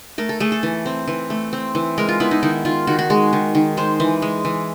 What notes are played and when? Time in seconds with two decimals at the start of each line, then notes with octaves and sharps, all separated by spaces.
0.18 A3 A#4
0.29 A4
0.40 A3 G#4
0.52 A4
0.63 E3
0.86 C4
1.08 E3
1.30 A3
1.53 C4
1.75 E3
1.98 G#3 A#4
2.09 F4
2.20 B3 E4
2.31 D#4
2.43 D#3 E4
2.65 D#3 F4
2.87 D#3 F#4
2.99 F#4
3.10 G#3 G#4
3.33 D#3
3.55 D#3
3.77 G#3 C5
4.00 E3
4.22 G#3
4.45 E3